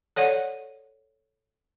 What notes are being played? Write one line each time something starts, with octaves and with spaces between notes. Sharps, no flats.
A4 C#5 D5 F#5